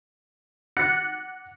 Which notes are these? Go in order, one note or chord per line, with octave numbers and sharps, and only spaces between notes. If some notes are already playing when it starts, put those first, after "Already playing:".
F#5 D6 F#6 A6 A#6 C#7